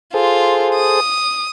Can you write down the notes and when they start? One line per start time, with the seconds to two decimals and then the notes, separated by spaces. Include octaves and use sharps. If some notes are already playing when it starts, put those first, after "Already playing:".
0.14 F4 G#4 A4 C5
0.76 D#6